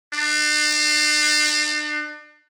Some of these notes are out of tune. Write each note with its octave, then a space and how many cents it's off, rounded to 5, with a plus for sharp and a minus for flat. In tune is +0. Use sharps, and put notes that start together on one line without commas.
D4 +40